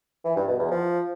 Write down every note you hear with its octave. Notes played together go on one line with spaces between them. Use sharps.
E3
G2
B2
E2
F3